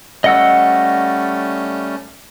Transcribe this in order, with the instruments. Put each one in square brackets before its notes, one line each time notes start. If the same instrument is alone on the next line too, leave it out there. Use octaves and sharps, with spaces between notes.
[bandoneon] G3 A3 C#4 [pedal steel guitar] D#5 F#5 E6